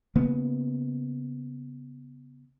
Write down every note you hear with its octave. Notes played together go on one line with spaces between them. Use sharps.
C#3 A#3 B3